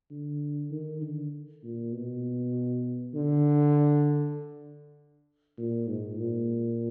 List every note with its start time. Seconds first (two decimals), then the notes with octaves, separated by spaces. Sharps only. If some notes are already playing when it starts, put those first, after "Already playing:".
0.10 D3
0.71 D#3
1.02 D3
1.63 A#2
1.93 B2
3.15 D3
5.58 A#2
5.88 G#2
6.18 A#2